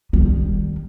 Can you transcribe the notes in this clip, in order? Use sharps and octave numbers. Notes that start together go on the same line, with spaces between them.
D#3 G3